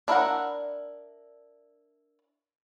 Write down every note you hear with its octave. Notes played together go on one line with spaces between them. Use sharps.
D4 E4 A#4 F#5